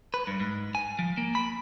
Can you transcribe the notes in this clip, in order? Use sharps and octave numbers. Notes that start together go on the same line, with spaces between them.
B4
G2
G#2
G#5
F3
A#3
B5